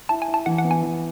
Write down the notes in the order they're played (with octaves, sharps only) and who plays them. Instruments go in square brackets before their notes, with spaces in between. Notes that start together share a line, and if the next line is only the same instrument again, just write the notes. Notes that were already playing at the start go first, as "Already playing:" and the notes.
[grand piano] E4 [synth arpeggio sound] A5
[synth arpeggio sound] G#5
[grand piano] E4
[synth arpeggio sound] A5
[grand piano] E3 [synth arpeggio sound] F#5
[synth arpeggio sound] F#5
[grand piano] B3
[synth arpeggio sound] G#5
[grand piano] E3